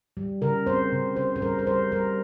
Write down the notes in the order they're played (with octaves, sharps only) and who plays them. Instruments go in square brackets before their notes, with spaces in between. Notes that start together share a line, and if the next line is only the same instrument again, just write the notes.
[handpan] G3
C#3 A#4
C4 C5
C#3
C#3 C5
C5
G3 A#4
A#4
G3 C5
G3 A#4